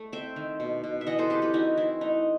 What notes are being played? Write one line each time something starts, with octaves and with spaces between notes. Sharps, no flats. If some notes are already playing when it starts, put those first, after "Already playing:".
Already playing: A3
C4 E5 G5
D#3
B2
B2
E5
E3 D#5 F#5
A4 C5
C4 G4 B4
G4 B4
E3 D#4 F#4
E3 C4 E4
A3 D#4